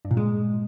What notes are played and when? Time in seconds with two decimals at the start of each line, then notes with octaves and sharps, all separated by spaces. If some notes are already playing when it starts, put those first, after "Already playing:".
0.05 G2
0.11 A#2
0.17 G#3